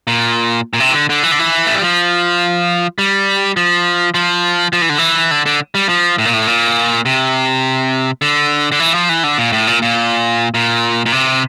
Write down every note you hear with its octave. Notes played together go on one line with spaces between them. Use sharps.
A#2
A#2
C3
E3
D3
D3
E3
D3
E3
A3
G3
F3
G3
F3
F3
F3
E3
D3
E3
D3
D3
G3
F3
A2
A#2
A2
A#2
C3
D3
D3
E3
F3
E3
D3
A#2
A2
A#2
A#2
A#2
A#2
C3